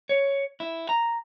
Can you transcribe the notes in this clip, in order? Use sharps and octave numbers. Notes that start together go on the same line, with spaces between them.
C#5
E4
A#5